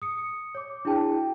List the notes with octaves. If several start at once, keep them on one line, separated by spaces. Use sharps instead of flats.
D#6 C#7
C#5 D6
D4 E4 F#4 G#4 G5 A5